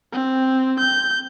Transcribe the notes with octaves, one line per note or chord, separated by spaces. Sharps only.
C4
G6